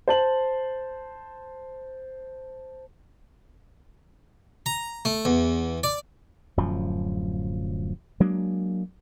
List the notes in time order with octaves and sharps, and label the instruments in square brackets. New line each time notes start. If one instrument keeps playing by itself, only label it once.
[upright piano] C5 A5 F#7
[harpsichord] A#5
A3
E2
D5
[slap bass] D1 F#2 F3
F#3 G#3 A#3 D4